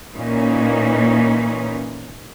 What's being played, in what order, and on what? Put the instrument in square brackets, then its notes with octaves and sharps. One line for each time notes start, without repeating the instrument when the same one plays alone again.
[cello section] A#2 E3 A#3 C#4 D#4